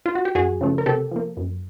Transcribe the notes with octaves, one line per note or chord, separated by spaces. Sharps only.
F4
F#4
G4
F#2 F#4 G#4
C#3 F3 A3
A#4
C3 G4 A4
F3 A#3
F#2